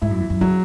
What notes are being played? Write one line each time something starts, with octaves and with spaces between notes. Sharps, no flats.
G#2 E4
F#2
E2
F#2
C#3 F#3